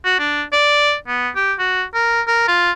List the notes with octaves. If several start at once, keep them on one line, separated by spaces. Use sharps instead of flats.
F#4
D4
D5
B3
G4
F#4
A#4
A#4
F4